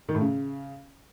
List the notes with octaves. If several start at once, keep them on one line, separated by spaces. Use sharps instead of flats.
D#3
A2
C#3